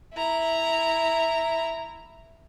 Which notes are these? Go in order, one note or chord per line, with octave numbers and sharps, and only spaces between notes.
E4 A#5